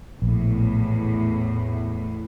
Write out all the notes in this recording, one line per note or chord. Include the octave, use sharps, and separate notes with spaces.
A#1 E2 A2